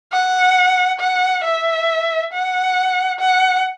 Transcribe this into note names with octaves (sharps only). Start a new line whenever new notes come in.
F#5
F#5
E5
F#5
F#5